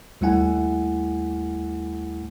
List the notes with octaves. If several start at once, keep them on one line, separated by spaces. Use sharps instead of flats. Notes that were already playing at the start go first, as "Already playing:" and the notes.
D#2 G3 A3 E4 F#5 G#5